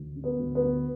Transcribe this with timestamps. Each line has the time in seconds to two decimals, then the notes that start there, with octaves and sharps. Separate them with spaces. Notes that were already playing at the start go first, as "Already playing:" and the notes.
Already playing: D2
0.16 D3
0.24 B3
0.39 D2
0.55 B3
0.62 D2